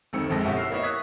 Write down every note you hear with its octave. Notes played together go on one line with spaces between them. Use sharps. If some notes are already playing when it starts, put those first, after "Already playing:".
F1 D2 D#3 C4 E6 C#7
A#1 F2 G#3 A#6
G1 B2 E4 G4 F#5 C#6
E6 F6 C7
A#3 B3 E4 C#5 D#5 E5
C#6 D#6 F#6 G#6 B6